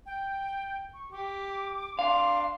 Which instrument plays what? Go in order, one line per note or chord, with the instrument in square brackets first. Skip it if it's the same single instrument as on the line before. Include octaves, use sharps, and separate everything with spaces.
[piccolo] G5
C#6
[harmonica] G4 [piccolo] D6
[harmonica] D4 C6 [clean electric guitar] F5